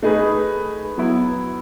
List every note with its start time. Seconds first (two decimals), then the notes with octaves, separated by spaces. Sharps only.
0.03 A3 D#4 G#4 B4
0.98 F#3 B3 E4